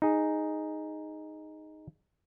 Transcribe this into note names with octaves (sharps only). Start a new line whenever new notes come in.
D#4 G#4